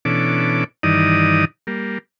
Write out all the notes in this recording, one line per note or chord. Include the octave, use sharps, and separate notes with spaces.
B2 E3 C#4 D4 A4 D6
G2 D#3 E3 D#4 D5 D#6
G3 A#3